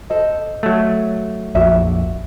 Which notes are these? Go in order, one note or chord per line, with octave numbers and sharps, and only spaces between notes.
A4 C5 D#5
F#3 A3
A#1 F2 F#4 D5 E5